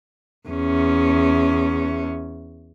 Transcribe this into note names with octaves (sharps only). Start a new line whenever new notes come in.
E2 C#4